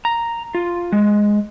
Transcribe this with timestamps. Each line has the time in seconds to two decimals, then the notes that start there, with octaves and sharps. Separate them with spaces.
0.05 A#5
0.55 F4
0.92 G#3